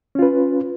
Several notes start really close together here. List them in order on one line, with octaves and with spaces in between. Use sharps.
C#4 F4 B4